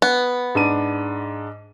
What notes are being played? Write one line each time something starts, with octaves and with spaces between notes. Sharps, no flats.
B3
G#2 D4 D#7